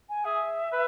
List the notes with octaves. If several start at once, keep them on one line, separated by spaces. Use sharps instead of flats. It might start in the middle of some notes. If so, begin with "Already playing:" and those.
G#5
G#4 E5
B4